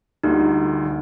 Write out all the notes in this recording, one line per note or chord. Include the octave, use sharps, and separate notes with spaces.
D2 D3 G3 A#3 D#4 F4
D3